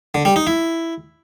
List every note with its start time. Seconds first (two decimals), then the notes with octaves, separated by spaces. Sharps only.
0.14 D3
0.25 G3
0.36 D#4
0.47 E4